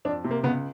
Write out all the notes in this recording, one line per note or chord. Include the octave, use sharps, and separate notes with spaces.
F2 D4
C3
A#3
C#2 B3